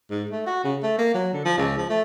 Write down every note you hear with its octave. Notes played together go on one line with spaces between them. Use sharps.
G#2
A3
F#4
C#3
A3
A#3
F#3
D3
F3
C#2
F3
A3